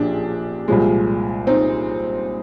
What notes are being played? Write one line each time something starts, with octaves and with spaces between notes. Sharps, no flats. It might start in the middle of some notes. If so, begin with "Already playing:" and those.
Already playing: A#1 A#2 D4 G4 G#4
C2 A#2 F3 G#3
C4 D#4